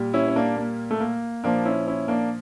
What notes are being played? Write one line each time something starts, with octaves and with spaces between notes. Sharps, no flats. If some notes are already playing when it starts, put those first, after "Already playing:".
Already playing: A#2 G3
C#4 E4
C#4
A#3 D4
A#3
A3
A#3
A#2 F3 A#3 D4
C#4 E4
C#4 E4
A#3 D4